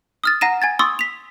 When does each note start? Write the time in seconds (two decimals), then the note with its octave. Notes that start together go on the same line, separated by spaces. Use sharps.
0.24 D#6 F6 A6
0.41 F#5 A#5 A#6 D#7 E7
0.62 G#5 G#6 A6
0.79 C6 C#6 D#6 E6 A6
0.99 B6 F7